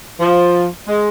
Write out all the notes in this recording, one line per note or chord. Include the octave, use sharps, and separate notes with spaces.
F3
G#3